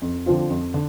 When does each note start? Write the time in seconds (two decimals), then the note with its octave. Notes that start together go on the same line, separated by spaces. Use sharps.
0.02 F2
0.26 D3 F3 C4 F4
0.50 F2
0.74 D3